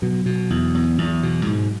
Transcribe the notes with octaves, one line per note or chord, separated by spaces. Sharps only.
B2 F#3
B2
E2
E2
E2
B2
G#2